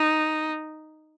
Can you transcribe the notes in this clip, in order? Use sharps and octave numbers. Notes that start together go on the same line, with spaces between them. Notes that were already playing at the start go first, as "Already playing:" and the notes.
Already playing: D#4